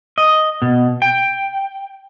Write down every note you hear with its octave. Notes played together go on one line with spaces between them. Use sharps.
D#5
B2
G5